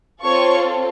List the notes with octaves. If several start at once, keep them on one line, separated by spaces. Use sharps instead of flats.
C4 F4 A4 C#5 C#6